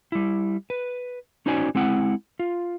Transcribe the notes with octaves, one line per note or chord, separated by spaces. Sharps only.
G3 E4
B4
C#4 D#4 F#4 C5 D5 G#5
G#3 C4 E4 F#5
F4